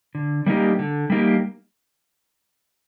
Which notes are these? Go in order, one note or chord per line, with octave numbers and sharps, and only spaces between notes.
D3
G3 A#3 D#4 G4
D3
G3 A#3 D#4 G4